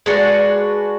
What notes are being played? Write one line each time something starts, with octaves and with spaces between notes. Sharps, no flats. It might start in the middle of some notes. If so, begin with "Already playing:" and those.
G#3 D4 F#4 B4